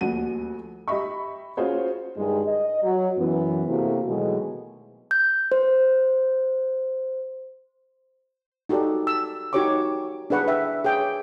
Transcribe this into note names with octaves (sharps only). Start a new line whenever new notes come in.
D#1 D2 F3 F#4 D#7
G4 D#5 E5 B5 C#6
C#4 F4 F#4 G#4 C5 C#5
G2 D#3 G#3
D#5
F#3
F#2 E3 B3
C3 A3 A#3 E4 F#4 C5
B2 D#3 E3 F#3 G#3 A3
G6
C5
D#4 F#4 G4 A4 D5
E6
D#4 F#4 G4 C#5 C#6 D6
D4 G#4 B4 F#5 C#6
E5 G5
G#4 C#5 G5